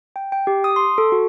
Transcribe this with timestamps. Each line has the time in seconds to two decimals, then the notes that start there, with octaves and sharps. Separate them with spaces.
0.16 G5
0.32 G5
0.47 G4
0.64 D#6
0.76 C6
0.98 A4
1.12 F#4